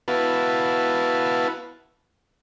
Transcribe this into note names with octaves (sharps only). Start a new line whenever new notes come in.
B3 E4 F#4 B4 F5 A5